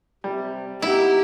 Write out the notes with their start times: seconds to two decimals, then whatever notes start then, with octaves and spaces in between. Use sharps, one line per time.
0.24 C3 G3
0.82 B3 D#4 E4 G4